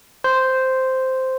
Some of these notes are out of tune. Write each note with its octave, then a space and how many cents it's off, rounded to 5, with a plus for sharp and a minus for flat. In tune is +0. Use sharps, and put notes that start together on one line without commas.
C5 -5